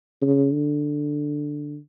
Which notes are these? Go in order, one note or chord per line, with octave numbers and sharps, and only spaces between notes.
C#3
D3